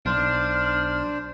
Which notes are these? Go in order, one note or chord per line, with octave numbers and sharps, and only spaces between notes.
B1 D4 C5 F6